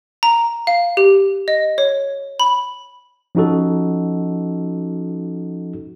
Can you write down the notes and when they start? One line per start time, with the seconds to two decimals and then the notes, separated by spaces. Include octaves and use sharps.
0.23 A#5
0.67 F5
0.97 G4
1.48 D#5
1.78 C#5
2.40 B5
3.35 F3 C#4 D#4 F#4 A4